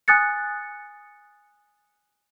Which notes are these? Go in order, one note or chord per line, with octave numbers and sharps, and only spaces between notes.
G#5 D#6 F#6 A6 C#7